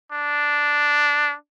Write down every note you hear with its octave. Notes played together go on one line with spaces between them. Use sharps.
D4